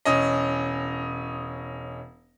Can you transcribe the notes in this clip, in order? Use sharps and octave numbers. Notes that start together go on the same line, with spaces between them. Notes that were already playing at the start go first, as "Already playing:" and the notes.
E1 C#4 D#5